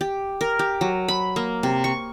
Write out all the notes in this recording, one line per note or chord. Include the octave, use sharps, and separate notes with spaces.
G4
A#4
G4
F#3
B5
A#3
C3
C#6